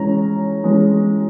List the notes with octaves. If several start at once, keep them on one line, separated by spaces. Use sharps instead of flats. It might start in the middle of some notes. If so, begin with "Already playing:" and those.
Already playing: E3 G#3 C#4 A#5
E3 G#3 C#4